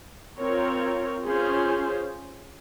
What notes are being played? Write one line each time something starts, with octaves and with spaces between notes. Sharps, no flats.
C4 F4 A#4 C#5
C#4 F4 G#4 C5